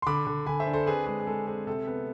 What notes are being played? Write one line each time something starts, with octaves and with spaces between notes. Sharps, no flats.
C6
D3 B5 D6
D3
D3 G#5 B5
C5 E5
D4
A4 C5
C4 G#4 B4
G#3 G#4 B4
G#4
G#3 A4
C4 G#4
C3 A4
B3